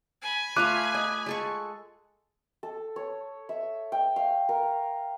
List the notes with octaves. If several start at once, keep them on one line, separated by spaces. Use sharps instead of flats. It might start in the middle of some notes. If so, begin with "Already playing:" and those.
G#5 B5
A3 F4 F5 D6 F#6 D#7
D#5
G#3 A4 C#6
A4
C#5
E5
G5
F5
A#4